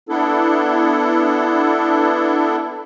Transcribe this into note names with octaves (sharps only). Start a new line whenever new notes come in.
B3 D4 E4 A4